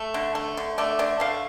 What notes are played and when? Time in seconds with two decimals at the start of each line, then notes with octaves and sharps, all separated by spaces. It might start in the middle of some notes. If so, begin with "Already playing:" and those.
Already playing: A3
0.14 D3
0.35 A3
0.57 D3
0.78 A3 D5
0.99 D3 D5
1.20 A3 F5